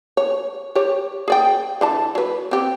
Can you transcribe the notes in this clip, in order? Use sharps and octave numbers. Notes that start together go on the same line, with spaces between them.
C#5
G4 C#5
G#4 D5 G5
D3 E3 A5
F#3 B4
C4 G4